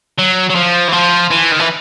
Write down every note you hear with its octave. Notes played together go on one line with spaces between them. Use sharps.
F#3
F#3
F3
E3
F3
E3
D#3
E3